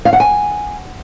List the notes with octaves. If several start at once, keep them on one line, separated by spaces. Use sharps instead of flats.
F5
F#5
G#5